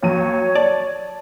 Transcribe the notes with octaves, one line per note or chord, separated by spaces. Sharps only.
D#2 F#3 C#5 D#7
D5 A5